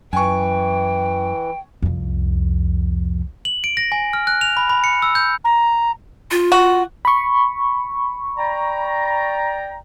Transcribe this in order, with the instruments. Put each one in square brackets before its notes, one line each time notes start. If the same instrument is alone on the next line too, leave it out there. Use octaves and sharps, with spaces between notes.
[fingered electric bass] F#2 [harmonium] E3 [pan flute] G5 [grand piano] G#5 C#6
[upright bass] C2 F2
[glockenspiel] F#7
D7
A#6
G#5
F6
F#6
F7
B5
B5
C#7
E6
G6
[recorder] A#5
[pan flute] F4
[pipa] F#4
[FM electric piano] B5 C#6
[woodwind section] D5 G5 A#5